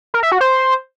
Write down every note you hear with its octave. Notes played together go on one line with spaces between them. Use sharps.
A#4
E5
F#4
C5